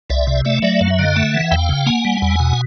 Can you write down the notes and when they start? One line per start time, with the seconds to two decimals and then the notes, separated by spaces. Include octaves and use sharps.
0.10 C2 D5 E5
0.27 C3
0.45 A3 D5 E5
0.62 F#3 D5 E5
0.81 F#2 F5
0.90 E5
0.99 D3 D#5 F5
1.16 A3 E5 F#5
1.34 E3
1.51 E2 F5 G5
1.69 C#3
1.86 A#3 F#5 G#5
2.05 G3
2.22 E2
2.40 B2